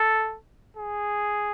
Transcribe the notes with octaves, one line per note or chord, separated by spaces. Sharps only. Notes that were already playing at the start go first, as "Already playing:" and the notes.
Already playing: A4
G#4